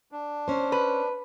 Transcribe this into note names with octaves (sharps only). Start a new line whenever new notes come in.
D4
C#4 C5
B4